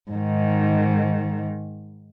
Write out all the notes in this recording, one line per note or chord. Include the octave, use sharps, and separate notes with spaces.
G#2 D#3